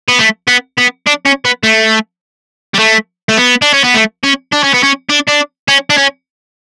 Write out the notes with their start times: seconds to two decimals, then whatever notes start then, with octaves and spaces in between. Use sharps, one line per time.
0.09 B3
0.19 A3
0.48 B3
0.78 B3
1.06 D4
1.25 C#4
1.45 B3
1.63 A3
2.74 G3
2.79 A3
3.29 A3
3.37 B3
3.62 D4
3.74 C#4
3.84 B3
3.94 A3
4.23 C#4
4.52 D4
4.63 C#4
4.74 B3
4.83 C#4
5.10 D4
5.28 D4
5.68 C#4
5.90 D4
5.98 C#4